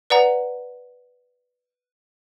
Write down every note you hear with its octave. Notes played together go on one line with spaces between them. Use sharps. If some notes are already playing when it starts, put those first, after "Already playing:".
B4 D5 F#5 A#5